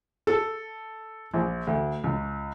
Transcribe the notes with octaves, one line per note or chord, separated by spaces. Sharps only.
A4
A#1
D2
C#2